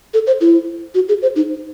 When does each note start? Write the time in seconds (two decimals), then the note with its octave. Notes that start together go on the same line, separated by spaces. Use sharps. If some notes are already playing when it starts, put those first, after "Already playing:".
0.14 A4
0.27 C5
0.41 E4
0.95 F#4
1.09 G#4
1.22 C5
1.36 D#4